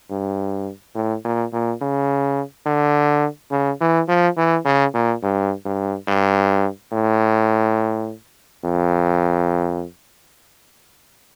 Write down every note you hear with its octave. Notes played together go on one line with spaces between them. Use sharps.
G2
A2
A#2
A#2
C#3
D3
C#3
E3
F3
E3
C#3
A#2
G2
G2
G2
A2
F2